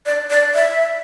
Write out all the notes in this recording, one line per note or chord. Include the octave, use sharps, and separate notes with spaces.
D5
D5
E5